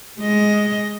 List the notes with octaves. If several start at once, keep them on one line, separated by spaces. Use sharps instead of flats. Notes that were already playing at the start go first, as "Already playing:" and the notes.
G#3 D#5